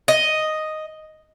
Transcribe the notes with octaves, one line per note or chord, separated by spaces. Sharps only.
D#5